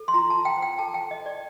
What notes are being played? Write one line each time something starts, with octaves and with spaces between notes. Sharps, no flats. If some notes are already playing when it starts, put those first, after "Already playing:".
Already playing: A4
C6
F4 A#5
F4 A5
G5
C5
G5
A4 A5
G5
C5
D#5
C5
D5